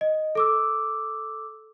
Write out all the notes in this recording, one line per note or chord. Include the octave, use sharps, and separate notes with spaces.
D#5
A4 D6 E6